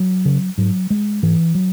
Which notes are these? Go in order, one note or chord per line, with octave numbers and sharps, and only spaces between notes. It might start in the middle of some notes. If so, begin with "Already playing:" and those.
Already playing: F#3
C#3
G#2 F#3
G#3
G#2 E3
F#3